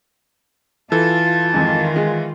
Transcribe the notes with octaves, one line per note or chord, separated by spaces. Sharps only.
E3 F4 A4 A5
F2 G#2 D#3 F4
G#3